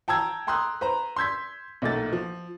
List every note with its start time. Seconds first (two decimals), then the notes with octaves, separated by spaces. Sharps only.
0.08 G5 A5 A#5 E6 G#6
0.47 G5 A#5 C6 D#6 E6 F#6
0.81 B4 C5 A#5
1.16 C6 E6 G6 G#6 B6
1.82 B1 A#2 A3 A6
2.12 F3